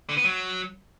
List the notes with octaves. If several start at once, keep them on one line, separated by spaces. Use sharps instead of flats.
D3
B3
F#3